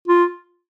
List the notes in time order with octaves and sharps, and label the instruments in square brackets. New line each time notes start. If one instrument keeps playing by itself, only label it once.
[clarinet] F4